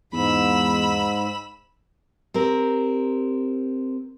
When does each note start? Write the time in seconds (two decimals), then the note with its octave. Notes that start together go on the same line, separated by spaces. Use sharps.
0.13 E2 G#2 B5 E6
2.34 C4 G4 A#4